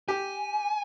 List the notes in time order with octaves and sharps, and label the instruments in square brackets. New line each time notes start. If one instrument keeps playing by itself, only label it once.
[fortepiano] G4 [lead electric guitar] G#5